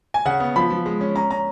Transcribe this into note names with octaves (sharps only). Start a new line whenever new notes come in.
G#5
C#3 F#5
B3
F3 B5
F3
G#3
C#4
C#4 A#5
C#4 A#5